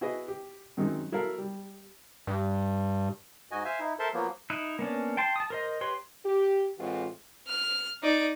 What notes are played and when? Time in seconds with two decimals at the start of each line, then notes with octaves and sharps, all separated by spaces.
0.01 E4 F#4 G#4 B4 D#5
0.28 G4
0.77 F#2 D#3 F#3 G#3 C4
1.12 F#3 E4 A4 A#4 F5
1.38 G3
2.27 G2
3.51 G#2 F#4 D#5 G#5
3.65 C5 E5 F5 G#5
3.80 D#4 E4
3.99 A4 A#4 C5 E5 A5 C6
4.14 F3 F#3 A#3 B3
4.50 D#4 E4 F#6
4.79 A#3 B3 C#4 D4
5.17 G5 A5 C6
5.36 A5 D#6
5.50 A#4 C5 D#5
5.81 G4 B4 C#5 C6
6.24 G4
6.79 A2 E3 G#3 C4 F4 F#4
7.47 F6
8.03 D#4 D5